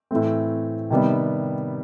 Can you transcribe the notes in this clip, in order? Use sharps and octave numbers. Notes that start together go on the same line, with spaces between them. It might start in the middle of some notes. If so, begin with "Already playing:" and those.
A2 E3 A3 C4
C3 D#3 G3 B3